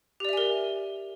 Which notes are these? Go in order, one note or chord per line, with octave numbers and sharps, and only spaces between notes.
G4 A#4 D5 E5 G#5